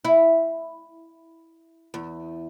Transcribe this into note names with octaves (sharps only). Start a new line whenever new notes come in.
E4
E2